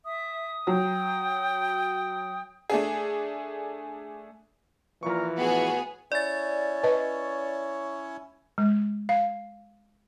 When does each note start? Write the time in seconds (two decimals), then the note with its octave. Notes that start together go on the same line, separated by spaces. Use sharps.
0.05 E5 D#6
0.67 F#3 G5
2.70 A3 D4 G#4
5.03 A#2 E3 F3 A#4 C#6
5.36 A2 B3 F#4 G#4
6.12 C#4 E4 C#5 D5 A6
6.83 B4 D#5 A5
8.58 G#3
9.09 F5